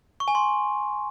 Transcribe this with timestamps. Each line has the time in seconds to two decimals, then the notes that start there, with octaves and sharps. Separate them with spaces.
0.20 C#6
0.28 G#5
0.35 C6